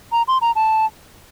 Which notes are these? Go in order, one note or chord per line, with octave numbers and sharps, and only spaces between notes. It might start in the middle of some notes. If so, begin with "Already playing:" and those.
A#5
C6
A#5
A5